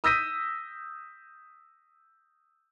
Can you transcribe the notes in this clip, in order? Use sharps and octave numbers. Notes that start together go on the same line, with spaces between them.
D#6 E6 G6 A#6 B6 D#7